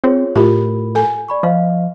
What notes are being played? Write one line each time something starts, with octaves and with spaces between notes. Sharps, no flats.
C4 F4 G#4 C#5
A2 F4 G4 A#4 B5
A4 G#5
D5 B5 C#6
F3 D#5 F5